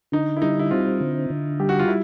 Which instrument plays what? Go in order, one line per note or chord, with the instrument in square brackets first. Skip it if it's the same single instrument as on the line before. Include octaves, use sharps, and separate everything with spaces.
[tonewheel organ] D3 [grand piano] D#4
[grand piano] E4
[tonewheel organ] G3 [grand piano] D#4
[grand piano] E4
[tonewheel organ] C4 [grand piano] F4
[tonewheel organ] D3
D3
[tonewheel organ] G3 [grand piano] G4
[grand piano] F#4
F4
E4